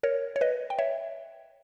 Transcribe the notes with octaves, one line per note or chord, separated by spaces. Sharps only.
A#4 C#5
C#5
B4 D#5
G5
C#5 E5